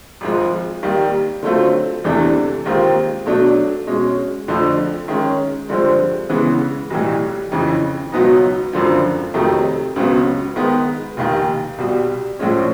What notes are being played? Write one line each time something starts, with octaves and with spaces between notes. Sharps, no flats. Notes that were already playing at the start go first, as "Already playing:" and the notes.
G#1 G#2 F3 G#3
D#2 D#3 G3
D3 F#3 A3 C4 F4
E2 C3 E3 A3 D4
D#2 D#3 G#3 C4 F4
B2 F#3 A3 D4
B2 G#3 C#4
F2 D3 F3 A3
D#3 G#3 C#4
G2 D3 F3 G#3 C4
C#3 E3 G#3 B3
B1 A2 E3 G3
F2 C#3 E3
C#2 B2 F#3 B3 D#4
G#1 F#2 D3 F3
F2 C3 D#3 F#3 A3
C#2 C#3 F#3 B3
D#3 G#3 B3
F1 D#2 D#3
C2 B2 G3
A#1 A2 F3 G#3 C#4